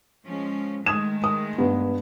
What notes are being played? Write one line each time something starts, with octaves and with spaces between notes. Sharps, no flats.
F3 G#3 C#4
D#3 G#3 A3 D#6 G#6 E7
D#6
G2 B3